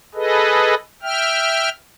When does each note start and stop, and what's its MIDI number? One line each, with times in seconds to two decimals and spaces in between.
0.15 0.75 68
0.15 0.75 69
0.15 0.75 71
0.15 0.75 75
1.03 1.69 76
1.03 1.69 79
1.03 1.69 89